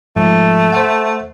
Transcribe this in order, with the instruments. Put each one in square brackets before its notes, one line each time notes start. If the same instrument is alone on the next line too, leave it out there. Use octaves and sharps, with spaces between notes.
[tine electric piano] G#2 F3 [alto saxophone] A3
[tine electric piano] C5 E5 F#5